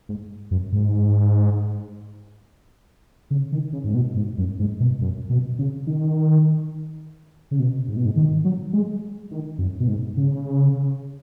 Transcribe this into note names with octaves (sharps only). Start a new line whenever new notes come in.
G#2
F#2
G#2
C#3
D#3
C#3
G#2
B2
G#2
F#2
G#2
B2
F#2
B2
C#3
D#3
C#3
B2
G#2
B2
G#2
D#3
F#3
G#3
D#3
F#2
B2
G#2
C#3